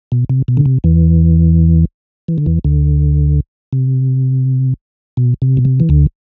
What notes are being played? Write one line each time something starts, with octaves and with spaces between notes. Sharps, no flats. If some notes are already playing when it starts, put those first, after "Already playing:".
B2
C3
B2
D3
C3
E2 E3
E3
D3
E2 E3
D2 D3
C3
B2
C3
B2
C3
E3
D2 D3